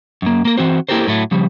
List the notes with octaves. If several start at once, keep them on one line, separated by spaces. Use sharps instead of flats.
F#2 A#3
A#3 A#4
E3 C4 F#4 C5
A#3 E4 G4 A4 A#4 C5
A2 F#3 A3
C#3 F3 G3